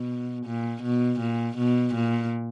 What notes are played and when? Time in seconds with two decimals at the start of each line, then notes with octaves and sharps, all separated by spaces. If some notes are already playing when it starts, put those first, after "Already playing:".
Already playing: B2
0.46 A#2
0.83 B2
1.20 A#2
1.57 B2
1.94 A#2